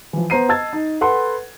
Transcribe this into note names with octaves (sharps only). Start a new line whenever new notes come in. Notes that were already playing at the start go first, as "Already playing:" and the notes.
E3 F3
B3 C5 A#5 C7 D#7
D#5 A5 E6 G#6 A6
D#4
A4 B4 F#5 C6